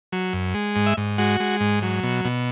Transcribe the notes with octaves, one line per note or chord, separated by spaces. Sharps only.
F#3
F#2
G#3
G#2
E5
G#2
G#3 F#4
G#3
G#2
F#3
B2
B2